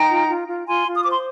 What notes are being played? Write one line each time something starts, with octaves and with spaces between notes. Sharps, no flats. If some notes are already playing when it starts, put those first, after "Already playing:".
Already playing: D#4 G5 A#5
F4
F4
F4
F4 G#5 C6
F4
D#6
C5 D6
C6